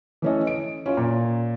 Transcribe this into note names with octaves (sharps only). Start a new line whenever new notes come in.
E3 A3 C#4 A4 D#5
D7
C#4 F4
A#2 A#5